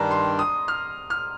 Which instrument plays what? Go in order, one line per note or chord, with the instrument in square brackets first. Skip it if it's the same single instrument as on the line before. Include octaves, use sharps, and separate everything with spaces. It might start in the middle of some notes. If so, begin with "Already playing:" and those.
Already playing: [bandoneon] G2 D#3 G3 D4 [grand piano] A#5
[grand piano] C6
D#6
F6
F6